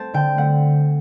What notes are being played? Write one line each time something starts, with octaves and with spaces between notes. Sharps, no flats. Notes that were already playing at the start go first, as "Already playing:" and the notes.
Already playing: A3 C4 A5
D3 G5
A3 F#5